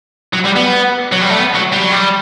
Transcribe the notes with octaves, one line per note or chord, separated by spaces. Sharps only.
F#3
G3
B3
F#3
G3
A3
B3
F#3
G3
F#3
G3